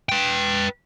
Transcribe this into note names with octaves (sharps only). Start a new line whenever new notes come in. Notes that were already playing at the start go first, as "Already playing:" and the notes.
B4 G5